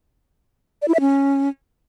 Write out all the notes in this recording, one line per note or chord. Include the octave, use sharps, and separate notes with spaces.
D5
E4
E5
C#4